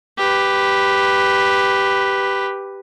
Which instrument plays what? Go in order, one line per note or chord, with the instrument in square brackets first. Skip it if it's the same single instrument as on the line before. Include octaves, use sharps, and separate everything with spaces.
[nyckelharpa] G4 B4